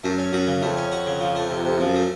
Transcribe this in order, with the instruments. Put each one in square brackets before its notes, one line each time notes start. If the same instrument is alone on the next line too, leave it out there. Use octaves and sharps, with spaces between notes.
[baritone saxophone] F#2 [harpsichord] A3
[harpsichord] C#4
[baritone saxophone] F#2 [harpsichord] F#4
[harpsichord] C#3
[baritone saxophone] F2 [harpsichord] A3
[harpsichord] C#4
F#4
C#3
F3
A3
C3
C3
[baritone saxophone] F#2 [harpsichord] F3
[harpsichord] A3